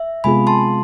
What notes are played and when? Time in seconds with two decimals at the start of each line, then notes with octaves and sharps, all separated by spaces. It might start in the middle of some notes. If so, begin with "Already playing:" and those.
Already playing: E5
0.24 C3 G#3 B3 F4 G#4 G#5 B5
0.47 A5 C6